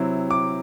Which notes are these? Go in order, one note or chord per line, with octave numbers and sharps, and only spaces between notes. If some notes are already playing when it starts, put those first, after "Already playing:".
Already playing: C3 F#3 C4 E4
D6